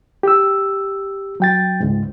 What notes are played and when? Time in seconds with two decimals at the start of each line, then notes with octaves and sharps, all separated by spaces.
0.23 G4 E6
1.40 F#3 G5 A6
1.80 C#2 G#2